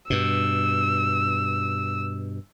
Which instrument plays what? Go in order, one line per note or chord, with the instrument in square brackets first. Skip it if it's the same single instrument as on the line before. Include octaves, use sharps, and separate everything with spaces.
[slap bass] G2 B2 [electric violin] E6